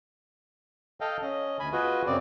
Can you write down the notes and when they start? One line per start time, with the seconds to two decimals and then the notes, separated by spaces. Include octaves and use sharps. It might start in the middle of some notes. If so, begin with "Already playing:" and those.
1.01 A4 D#5 F5 G5
1.22 C#4 D#5
1.60 D2 G#5 B5
1.72 B3 F4 F#4 G#4 B4 D#5
2.06 F#2 C#3 C4 D5